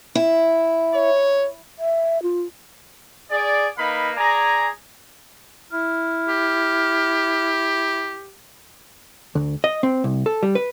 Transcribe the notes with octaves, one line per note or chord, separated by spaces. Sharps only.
E4
C#5
E5
F4
G#4 D5
A#3 D#4 B4 F5 B5
G#4 D5 G#5 A#5
E4 F6
G4
D2
D#5
C4
C2
A4
G3
B4